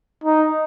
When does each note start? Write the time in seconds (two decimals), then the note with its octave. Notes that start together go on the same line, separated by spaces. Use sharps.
0.24 D#4